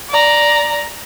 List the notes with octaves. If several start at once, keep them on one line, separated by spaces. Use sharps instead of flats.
D5 A#5